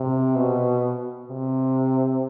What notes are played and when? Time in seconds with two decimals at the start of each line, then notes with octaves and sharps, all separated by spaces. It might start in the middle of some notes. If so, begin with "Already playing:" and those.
Already playing: C3
0.35 B2
1.28 C3